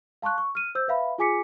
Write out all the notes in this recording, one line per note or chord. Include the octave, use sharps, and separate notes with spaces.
F5 A5 C6 C#6 F#6
C#6
F6 D#7
C5 E6 G6
B4 E5 F5 B5
F4 G#4 G#5 D6 B6 C#7